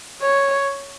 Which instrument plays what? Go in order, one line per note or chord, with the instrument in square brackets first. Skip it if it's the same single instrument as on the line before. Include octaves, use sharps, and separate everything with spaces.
[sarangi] C#5